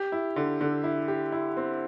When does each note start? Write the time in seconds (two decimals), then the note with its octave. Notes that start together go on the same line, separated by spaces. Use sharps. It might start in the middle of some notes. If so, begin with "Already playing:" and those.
Already playing: G4
0.12 E4
0.36 D3
0.61 D3
0.84 E4
1.08 G4
1.32 E4
1.57 C4